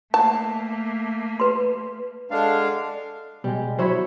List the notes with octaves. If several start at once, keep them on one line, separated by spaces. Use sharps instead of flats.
A3 A#3 A5
B4 C6
G#3 D4 A4 F5 F#5 A5
B2 G3 G#3
F#3 E4 C5 C#5 B5